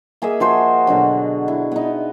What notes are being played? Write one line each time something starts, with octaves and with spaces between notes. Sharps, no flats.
A#3 G#4 D#5 E5
F3 F#4 C5 G#5
B2 D3 F#3
E4
B3 D#4